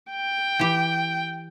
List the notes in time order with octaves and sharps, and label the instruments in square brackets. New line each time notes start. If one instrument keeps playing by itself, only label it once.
[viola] G5
[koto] E3 G4